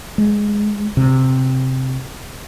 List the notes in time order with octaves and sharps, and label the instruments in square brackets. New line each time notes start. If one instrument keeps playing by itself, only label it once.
[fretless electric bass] G#3
C3